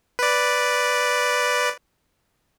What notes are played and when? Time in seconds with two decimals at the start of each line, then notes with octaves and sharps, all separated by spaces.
0.19 B4 D5